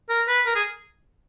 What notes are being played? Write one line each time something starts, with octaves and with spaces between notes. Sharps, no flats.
A#4
B4
A#4
G#4